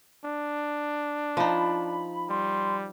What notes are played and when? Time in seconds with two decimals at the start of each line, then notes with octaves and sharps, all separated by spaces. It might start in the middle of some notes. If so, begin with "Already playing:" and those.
0.25 D4
1.37 F3 D#4 B5
2.29 G3 C6